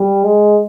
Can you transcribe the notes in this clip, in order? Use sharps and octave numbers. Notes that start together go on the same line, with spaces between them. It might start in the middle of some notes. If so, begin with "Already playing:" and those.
Already playing: G3
G#3